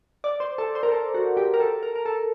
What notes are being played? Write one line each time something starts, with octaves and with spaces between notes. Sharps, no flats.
D5
C5
A4
C5
A#4
A4
F#4
G4
A#4
A4
A#4
A#4
A4